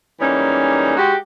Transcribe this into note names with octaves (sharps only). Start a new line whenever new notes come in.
G#2 E3 G3 A#3 C#4 D#4
G#3 F#4 G4